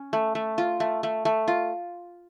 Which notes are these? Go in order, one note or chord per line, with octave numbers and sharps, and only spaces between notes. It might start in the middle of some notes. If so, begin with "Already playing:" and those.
Already playing: C#4
A3
A3
F4
A3
A3
A3
F4